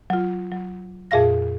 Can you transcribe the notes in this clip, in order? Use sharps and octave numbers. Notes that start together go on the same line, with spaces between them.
F#3 F4
F#3
F2 A#2 G#4 E5 F5 A#6